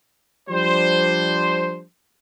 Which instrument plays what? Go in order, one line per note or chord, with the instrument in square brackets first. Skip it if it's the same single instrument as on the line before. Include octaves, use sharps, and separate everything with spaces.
[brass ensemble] F3 G3 D4 C5